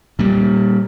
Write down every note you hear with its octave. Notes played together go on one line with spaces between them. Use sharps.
A#2 G3